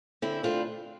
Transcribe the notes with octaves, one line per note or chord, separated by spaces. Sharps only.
D3 C4 E4
A3 C4 D4 F4